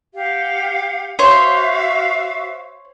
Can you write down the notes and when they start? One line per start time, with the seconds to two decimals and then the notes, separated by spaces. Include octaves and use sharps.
0.15 G4 F5 F#5
1.19 F#4 C5 C#5 E5 F5